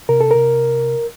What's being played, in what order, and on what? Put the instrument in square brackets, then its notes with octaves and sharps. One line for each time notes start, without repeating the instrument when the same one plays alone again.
[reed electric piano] C3 A#4
A4
C3 A#4